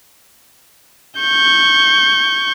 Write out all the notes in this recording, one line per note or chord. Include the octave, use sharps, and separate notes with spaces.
C#6 G6